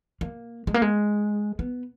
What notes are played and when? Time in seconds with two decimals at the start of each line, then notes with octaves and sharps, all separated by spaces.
0.21 A#3
0.67 G#3
0.74 A#3
0.82 G#3
1.59 B3